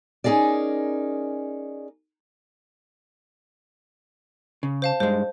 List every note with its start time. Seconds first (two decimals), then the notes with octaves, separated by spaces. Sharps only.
0.24 C#4 D#4 G#4 A#4 D5
4.63 C#3
4.82 C5 F5 A5
5.00 G2 G#3 C5